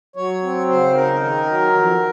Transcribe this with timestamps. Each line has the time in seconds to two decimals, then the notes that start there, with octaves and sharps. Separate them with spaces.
0.16 F#3 C#5
0.42 C4
0.69 C#3 C5
0.94 D#4 A#4
1.20 D#3 A#4
1.46 F#3
1.73 F2